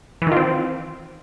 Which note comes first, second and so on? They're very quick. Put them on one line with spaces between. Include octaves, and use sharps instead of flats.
E3 D#3 F4 C4